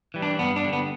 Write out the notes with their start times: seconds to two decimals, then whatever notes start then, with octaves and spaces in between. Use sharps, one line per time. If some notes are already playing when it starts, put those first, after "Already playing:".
0.14 E3 G3
0.22 D4
0.39 G2 B3
0.56 D4
0.64 D3 G3
0.73 B3